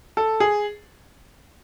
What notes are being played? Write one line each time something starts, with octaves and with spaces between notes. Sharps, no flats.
A4
G#4